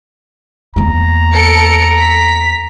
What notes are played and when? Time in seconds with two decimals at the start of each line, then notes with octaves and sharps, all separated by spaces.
0.76 E2 A#3 A#5
1.32 A4 C#7 D7
1.98 B6